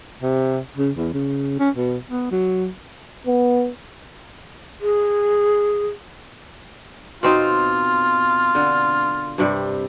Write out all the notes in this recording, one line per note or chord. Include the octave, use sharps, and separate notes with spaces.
C3
C#3
E2
C#3
C#4
B2
B3
F#3
B3
G#4
B2 C4 D#4 F4
D3
G2 C3 G3